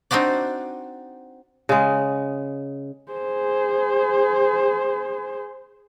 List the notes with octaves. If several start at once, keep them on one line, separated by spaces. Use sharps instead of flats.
C4 D4 D#4 F#4 D5
C#3 G#3
G#4 C5